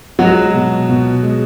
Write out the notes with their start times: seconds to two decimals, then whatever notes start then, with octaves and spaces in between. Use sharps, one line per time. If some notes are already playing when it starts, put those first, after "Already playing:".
0.19 F#3 G#3 F#4
0.54 B2
0.89 B2
1.23 G#3